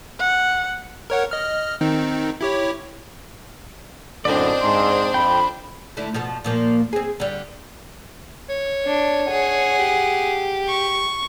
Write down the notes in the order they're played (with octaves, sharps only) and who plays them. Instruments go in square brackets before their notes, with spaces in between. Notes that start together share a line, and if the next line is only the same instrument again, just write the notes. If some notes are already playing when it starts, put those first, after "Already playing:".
[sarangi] F#5
[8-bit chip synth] A#4 C#5 F#5
D#5 F6
D#3 C4 D#4
E4 G4 C#5
[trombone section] F#2 A2 D3 [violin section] C4 D4 C5 [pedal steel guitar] D5 D#5
[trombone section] G#2 [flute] C6
[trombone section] F2 [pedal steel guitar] G5 [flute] B5
[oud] D3 A3 E4
B2 F3 A4
A#2 F3 A#3
C4 G#4
D3 G3
[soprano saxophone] C#5
[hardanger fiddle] D4
G#4 F#5
[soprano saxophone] G4
[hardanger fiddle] C#6